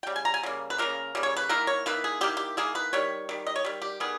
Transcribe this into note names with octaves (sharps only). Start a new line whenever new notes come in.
G5
C#3 G3
G#5
A#5
G#5
C#3 G3 A#3
B4
C#3 G3 A#3 A#4
C#3 G3 A#3
C#5
B4
D#3 A#3 E4 A#4
C#5
D#3 A#3 E4 B4
G#4
D#3 A#3 E4 G4
G4
D#3 A#3 E4 G#4
B4
D#3 G3 C#5
D#3 G3
D#5
C#5
D#3 G3
G4
D#3 G3 B3 G#4